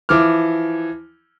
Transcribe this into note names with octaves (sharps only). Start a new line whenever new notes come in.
E3 F3 D6 F6